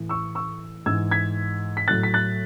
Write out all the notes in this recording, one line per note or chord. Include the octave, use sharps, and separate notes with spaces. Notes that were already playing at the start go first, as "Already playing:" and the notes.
Already playing: A2 E3
C#6 E6
C#6 E6
G#2 E3 E6 G#6
G#6 B6
B6
A2 F#3 F#6 A6
B6
F#6 A6